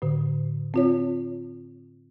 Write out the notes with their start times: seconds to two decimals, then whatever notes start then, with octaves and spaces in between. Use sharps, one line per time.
0.02 A2 D3
0.74 C4 F4 C#5